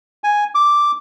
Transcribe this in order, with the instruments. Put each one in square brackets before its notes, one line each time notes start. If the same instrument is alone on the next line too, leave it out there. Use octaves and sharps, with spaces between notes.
[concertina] G#5
D6